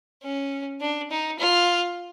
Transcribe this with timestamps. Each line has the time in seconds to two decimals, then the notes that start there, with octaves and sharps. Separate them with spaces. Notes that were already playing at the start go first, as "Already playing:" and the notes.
0.23 C#4
0.81 D4
1.10 D#4
1.39 F4